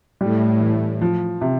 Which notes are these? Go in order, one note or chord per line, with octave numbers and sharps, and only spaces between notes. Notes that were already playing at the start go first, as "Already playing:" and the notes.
A2 G3
E3
F3
C3